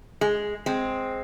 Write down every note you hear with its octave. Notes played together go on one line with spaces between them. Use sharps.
G#3
G#3 C4